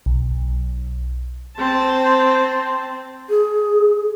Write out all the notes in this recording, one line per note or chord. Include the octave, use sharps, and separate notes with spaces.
B1
C4 C5 A5
G#4